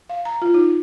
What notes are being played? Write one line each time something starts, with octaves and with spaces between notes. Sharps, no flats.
F5
A#5
F4
D#4